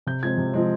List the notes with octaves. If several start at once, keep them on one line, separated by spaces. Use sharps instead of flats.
C3 G6
F3 G#3 C4 G#6
C3
F3 G#3 C4